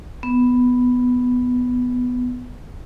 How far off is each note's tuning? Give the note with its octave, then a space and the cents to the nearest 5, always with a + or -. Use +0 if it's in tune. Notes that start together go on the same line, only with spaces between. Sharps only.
B3 +5